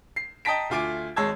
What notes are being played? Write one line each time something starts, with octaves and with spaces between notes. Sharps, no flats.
C7
D#5 G5 A5 A#5 B6 D7
D2 A3 F4 G#5 D6 D7
G#1 G#3 C#5 A5 E6 G#6